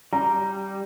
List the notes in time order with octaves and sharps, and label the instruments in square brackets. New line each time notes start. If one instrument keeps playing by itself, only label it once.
[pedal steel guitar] G3 [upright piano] A#5